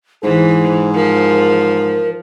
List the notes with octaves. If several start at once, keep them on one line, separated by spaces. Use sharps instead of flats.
G#2 E3 G#4 C5
F3 A#4